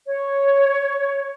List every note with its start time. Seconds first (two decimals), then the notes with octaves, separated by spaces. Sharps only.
0.07 C#5